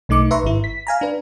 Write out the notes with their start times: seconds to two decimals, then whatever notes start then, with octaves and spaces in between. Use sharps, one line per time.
0.09 B1 A3 D#4 D6 C#7
0.31 B4 E5 A#5 C6 C#6
0.44 G#1 E4
0.64 B6
0.87 F5 G#5 A#5
1.01 D4 B4